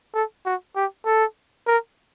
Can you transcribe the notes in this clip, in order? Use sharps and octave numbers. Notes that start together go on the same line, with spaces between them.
A4
F#4
G4
A4
A#4